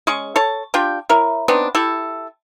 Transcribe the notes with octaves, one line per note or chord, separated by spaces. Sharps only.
G#3 C#4 G#4 C#6
A4 C#5 A5
D4 F4 G4 G5
E4 A#4 C#5
B3 C4 D4 D#4
E4 G4 A4